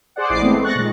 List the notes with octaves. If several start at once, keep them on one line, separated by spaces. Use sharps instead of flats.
G#4 C5 D5 F#5
A1 E4 D5 D#5 D6 C7
G#3 A3 B3 C4
C#6 F#6 A6 A#6
A#2 D#3 G#3